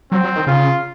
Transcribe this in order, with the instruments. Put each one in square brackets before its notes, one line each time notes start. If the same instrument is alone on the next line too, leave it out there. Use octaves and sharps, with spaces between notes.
[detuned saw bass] F#3 [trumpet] C4
[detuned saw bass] F#3
D#3
[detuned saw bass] C#3 [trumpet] F4